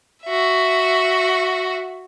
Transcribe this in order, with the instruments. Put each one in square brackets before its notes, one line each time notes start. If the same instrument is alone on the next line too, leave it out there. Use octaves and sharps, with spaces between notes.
[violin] F#4 E5